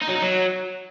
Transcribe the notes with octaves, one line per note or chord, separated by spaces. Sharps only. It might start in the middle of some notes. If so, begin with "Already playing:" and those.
D#4
F#3
D#4
F#3